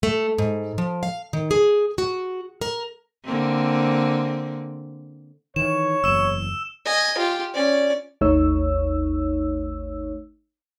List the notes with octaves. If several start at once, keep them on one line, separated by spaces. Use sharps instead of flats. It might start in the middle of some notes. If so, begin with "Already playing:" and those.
A3
G#2
F3
F5
D#3
G#4
F#4
A#4
D3 A#3 C4
D#3 E3 C#5 E7
F#1 E2 E6 E7
D#5 G#5
F4 G4
C#4 D5
G#1 D#2 A3 D#4 C#5 E6